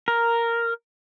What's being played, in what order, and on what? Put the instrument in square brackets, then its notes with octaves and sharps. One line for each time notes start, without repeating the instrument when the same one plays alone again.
[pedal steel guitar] A#4